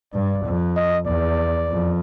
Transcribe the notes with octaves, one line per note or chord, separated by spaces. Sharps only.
G2 D5
F2
D#5
E2 D5
F2